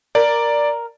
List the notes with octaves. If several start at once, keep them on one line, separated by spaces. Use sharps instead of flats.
A#4 D5